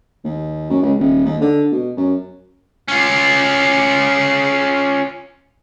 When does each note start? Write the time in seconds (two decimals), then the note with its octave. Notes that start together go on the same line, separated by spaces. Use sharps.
0.24 D#2
0.70 F#2
0.82 C#2
0.98 D#1
1.25 D#2
1.41 D3
1.72 B2
1.97 F#2
2.88 C#4 F4